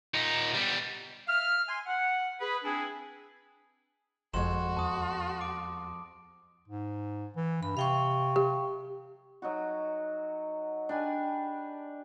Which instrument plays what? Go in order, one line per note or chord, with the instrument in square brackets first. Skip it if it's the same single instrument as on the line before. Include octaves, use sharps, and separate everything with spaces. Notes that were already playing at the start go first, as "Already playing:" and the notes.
[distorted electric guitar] A#2 D#4
G3 B3
[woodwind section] E5 F5 F6
G#5 C6
F#5
G#4 B4
C4 D4 E4 G#4
[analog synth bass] G1 [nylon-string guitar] F2 G#3 [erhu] F#4 [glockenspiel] C6 E7
[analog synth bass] E2 [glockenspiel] A5 D#6
[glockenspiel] D6 D7
[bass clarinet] G#2
E3
[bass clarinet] G2 [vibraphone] B5
[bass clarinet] C3 [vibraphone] F5 G5 C#6
[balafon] G4
[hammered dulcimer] F#3 D#4 F#4
D4 G4 B4 G#5